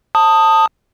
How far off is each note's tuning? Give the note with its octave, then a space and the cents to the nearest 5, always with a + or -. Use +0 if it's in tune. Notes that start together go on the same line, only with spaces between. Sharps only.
A5 +15 D#6 +0